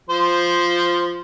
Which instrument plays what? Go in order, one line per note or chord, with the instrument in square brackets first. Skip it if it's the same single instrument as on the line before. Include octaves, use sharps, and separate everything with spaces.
[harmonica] F3 C5